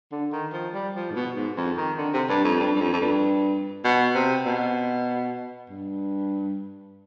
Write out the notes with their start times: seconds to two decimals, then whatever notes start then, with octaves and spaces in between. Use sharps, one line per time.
0.12 D3
0.32 D#3
0.53 F3
0.74 G3
0.95 F3
1.11 G#2
1.16 B2
1.36 G#2
1.57 F2
1.77 D#3
1.98 D3
2.13 C3
2.29 G2
2.44 F2
2.60 G2
2.76 G2
2.81 F2
2.92 F2
3.01 G2
3.84 B2
4.15 C3
4.46 B2
5.70 G2